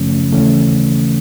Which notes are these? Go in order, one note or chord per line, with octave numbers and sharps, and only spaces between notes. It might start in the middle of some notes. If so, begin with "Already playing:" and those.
Already playing: F#2 C#3 F3 A3 C#4
D#2 C#3 E3 A3 C#4